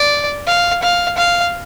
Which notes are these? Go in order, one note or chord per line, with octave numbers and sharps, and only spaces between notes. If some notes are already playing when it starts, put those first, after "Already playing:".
Already playing: D5
F5
F5
F5